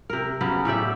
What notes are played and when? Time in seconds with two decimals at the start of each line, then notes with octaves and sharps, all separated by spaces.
0.10 C3 A#4
0.41 C#3 F#3 B3 C#4
0.65 A2 G4 D5 E5